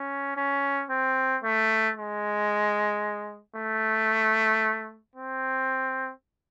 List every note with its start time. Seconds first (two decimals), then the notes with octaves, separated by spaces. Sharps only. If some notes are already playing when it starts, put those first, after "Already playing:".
Already playing: C#4
0.37 C#4
0.90 C4
1.44 A3
1.97 G#3
3.56 A3
5.16 C4